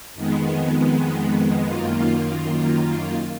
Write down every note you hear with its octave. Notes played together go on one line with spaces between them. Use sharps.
F2 D#3 G#3 B3
F#2 D#3 A#3 F4